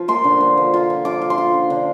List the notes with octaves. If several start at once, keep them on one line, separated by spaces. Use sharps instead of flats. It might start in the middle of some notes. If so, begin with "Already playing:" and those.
Already playing: F3 F4
A#3 C6
D3
A#3
F3
F4
F3
F4 D6
F4
C6
F4
D3
D3